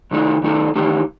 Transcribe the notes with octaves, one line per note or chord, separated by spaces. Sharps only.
C3 D#3 A3 D#4 A4
C3 D#3 A3 D#4 A4
E2 D#3 A3 D#4 G4